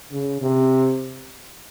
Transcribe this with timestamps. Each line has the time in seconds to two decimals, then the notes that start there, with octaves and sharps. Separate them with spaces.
0.12 C#3
0.42 C3